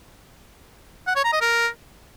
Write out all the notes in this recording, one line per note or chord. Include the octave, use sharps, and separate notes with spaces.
F#5
C#5
A#5
D#5
A#4